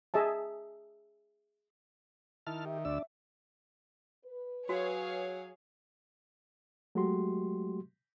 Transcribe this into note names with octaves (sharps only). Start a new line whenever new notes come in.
G#4 D#5 E5 A5
D#3 E4 A5 F6
G4 E5
D2 D4 D5 E6
B4
F#3 F#4 G#4 C#5 F5
F#3 G#3 A3 F#4 G4 C6